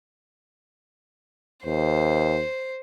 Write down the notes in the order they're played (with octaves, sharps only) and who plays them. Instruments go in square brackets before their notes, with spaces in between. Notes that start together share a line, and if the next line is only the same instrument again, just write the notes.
[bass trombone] D#2 [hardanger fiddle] C5